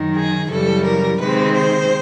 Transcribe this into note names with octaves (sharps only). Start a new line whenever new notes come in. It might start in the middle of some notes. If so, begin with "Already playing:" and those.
Already playing: F#2 D#3 F#3
G#4
F#2 C#3 E3 G3 A4
A#4
C3 D#3 G#3 C4 B4
C5